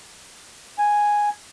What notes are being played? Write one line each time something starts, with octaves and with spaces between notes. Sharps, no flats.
G#5